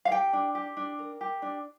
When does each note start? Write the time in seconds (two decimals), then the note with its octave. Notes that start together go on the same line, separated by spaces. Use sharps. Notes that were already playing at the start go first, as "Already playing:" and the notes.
0.05 F5
0.11 G4 G5
0.33 D4
0.55 G4
0.77 D4
0.99 A#4
1.21 G4
1.42 D4